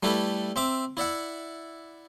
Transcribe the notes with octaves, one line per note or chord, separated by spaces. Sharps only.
G3 A3 E4 G4 A4 B4
C4 E5 D6
E4 D5 E5 F#5